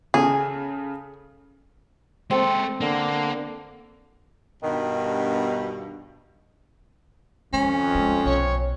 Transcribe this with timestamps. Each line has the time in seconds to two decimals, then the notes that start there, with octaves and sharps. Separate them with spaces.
0.14 C#3 G#4 A4
2.31 G#3 C4 A4
2.81 D3 A#3
4.63 G2 B2 D#3
7.53 F2 D#3 G#3 C#4
7.95 G#3 C4
8.25 B1 C#5